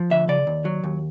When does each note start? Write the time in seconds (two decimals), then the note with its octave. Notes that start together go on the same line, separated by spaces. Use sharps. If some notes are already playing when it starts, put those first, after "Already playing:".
Already playing: F3
0.10 D2 E5
0.28 C#3 D5
0.47 D#2
0.65 F#3
0.83 D#2